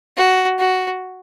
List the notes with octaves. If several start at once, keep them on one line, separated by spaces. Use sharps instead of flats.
F#4
F#4